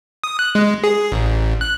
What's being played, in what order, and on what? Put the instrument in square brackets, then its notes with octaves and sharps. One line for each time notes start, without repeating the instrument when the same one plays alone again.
[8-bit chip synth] D#6
F#6
G#3
G#4
A1
F#6